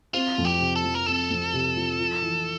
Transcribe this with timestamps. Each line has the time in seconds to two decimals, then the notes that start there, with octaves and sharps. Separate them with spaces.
0.14 C4 F4
0.38 F2
0.45 G4
0.60 C3
0.76 A4
0.83 F3
0.95 A#4
1.06 C4 A4
1.30 F2
1.53 C3
1.76 F3
1.99 F4
2.22 E3